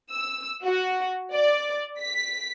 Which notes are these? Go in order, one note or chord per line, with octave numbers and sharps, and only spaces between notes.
E6
F#4
D5
B6